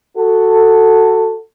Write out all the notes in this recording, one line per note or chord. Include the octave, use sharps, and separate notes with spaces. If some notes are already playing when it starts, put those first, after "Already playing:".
F#4 A4